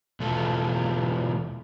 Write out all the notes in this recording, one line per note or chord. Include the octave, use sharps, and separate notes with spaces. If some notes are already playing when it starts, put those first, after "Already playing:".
E2 B2 F4 A4